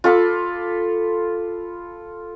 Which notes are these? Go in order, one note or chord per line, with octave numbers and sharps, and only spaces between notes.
F4 A4 B5 D6